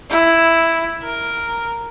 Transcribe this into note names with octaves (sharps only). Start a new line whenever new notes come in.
E4
A#4